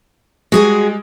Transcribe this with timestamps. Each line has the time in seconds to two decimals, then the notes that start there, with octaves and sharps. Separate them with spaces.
0.52 G3 G#3 F#4 G#4 G#5